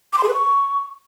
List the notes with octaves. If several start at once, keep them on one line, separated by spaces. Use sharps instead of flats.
D6
C6
G#4
B4
C#6